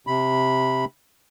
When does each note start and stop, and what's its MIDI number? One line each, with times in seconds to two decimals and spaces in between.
0.07 0.85 48
0.07 0.85 83